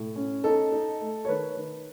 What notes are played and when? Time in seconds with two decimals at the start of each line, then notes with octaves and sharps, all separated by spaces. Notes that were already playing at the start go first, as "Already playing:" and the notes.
Already playing: A2
0.16 C#4
0.44 D#4 A4
0.72 D#4
1.01 A3
1.25 C#5
1.28 D#3 B4
1.57 D#3